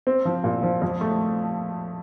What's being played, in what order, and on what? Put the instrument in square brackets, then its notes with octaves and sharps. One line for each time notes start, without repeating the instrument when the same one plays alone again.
[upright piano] C4
F3
A#2
F3
F2
A3